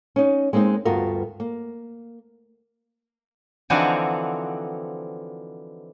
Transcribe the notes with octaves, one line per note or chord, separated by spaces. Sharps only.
C#4 D#4
G#3 A#3 C4 D4 D#4
D2 G2 B3 F4 F#4 A#4
A#3
D3 E3 F3 C4 D#4 F#4